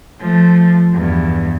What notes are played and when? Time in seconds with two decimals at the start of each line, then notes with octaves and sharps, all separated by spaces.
0.20 F3 A3
0.94 E2 G2